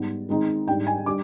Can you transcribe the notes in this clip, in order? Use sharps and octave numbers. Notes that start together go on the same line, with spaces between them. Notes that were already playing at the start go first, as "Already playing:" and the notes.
Already playing: G#2 G3 B3 D#4
D#3 G#3 C4 D#4
G#2 G3 D4 G5
G#5
G3 D4 D6